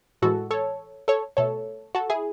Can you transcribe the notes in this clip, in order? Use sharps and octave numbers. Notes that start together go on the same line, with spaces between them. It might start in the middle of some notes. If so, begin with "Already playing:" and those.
A2 E3 G#3 F#4 A4
A4 C#5
A4 C#5
B2 A3 A4 C#5
F#4 A4
E4 G#4